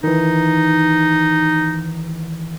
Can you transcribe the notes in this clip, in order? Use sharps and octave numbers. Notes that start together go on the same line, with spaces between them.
D#3 E3 D#4